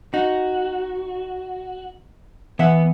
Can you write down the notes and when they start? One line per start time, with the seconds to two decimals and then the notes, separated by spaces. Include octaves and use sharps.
0.14 D#4 F#4
2.59 E3 B3 E5 F#5